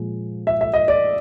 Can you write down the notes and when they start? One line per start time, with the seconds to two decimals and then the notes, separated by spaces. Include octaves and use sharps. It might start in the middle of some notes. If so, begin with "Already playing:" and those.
Already playing: A#2 F3 G#3
0.47 E5
0.61 E5
0.74 D#5
0.88 D5